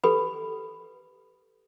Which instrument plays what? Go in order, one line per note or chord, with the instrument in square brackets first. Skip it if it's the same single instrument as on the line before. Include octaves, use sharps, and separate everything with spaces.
[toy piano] G4 A4 B4 B5